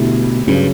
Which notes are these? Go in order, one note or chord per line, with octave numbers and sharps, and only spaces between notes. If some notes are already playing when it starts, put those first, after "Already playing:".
Already playing: B2 D3 A3 E4 G4
G2 C#3 F#3 C#4